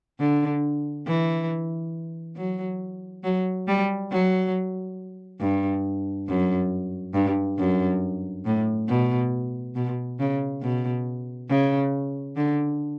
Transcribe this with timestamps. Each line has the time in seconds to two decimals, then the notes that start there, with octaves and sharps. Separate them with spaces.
0.20 D3
1.07 E3
2.36 F#3
3.24 F#3
3.68 G3
4.11 F#3
5.40 G2
6.28 F#2
7.14 G2
7.59 F#2
8.45 A2
8.89 B2
9.75 B2
10.19 C#3
10.62 B2
11.49 C#3
12.36 D3